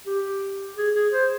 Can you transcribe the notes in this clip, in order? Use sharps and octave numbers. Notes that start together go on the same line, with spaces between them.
G4
G#4
G#4
C5